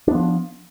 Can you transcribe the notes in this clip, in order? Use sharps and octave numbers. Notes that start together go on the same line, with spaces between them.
F3 B3 D4